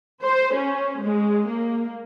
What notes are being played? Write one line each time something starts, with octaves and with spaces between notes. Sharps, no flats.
C5
C#4
G#3
A#3